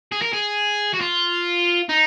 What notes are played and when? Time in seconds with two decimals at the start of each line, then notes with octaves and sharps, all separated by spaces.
0.12 G#4
0.22 A#4
0.33 G#4
0.93 F#4
1.01 F4
1.89 D#4